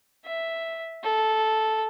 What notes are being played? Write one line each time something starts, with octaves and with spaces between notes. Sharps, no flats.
E5
A4